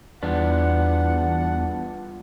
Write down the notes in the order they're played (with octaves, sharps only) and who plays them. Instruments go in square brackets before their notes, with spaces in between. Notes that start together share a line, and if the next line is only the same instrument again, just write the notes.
[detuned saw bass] E2 [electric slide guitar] G3 F4 B4 [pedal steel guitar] B3 D4 [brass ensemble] F#5